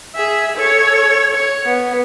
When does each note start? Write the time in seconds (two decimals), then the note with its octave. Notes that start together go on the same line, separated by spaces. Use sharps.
0.16 G#4 E5
0.57 A4 C#5
1.35 C#5
1.66 B3